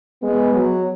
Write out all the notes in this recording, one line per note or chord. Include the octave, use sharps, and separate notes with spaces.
G#3 B3
F#3